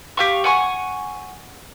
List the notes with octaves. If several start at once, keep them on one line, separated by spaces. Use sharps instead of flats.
G4 F5 C#6
F#5 G#5 C#6